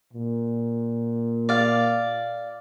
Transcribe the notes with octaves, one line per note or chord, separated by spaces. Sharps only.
A#2
D5 F5